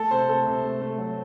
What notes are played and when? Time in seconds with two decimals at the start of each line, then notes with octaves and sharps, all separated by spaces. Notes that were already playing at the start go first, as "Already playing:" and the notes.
Already playing: A3 A4
0.11 C3 C5
0.29 A3 A4
0.47 C3
0.64 A3
0.81 A3
0.98 F#3